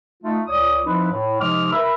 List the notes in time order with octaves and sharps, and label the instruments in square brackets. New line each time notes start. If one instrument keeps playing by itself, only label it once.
[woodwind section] A3 D#4 F4 A5
C#2 A#2 C#5 D5 D#6
F3 C4 D#4 E4 B4
A2
C3 F3 G#3 D#4 D6 F6
A#4 B4 E5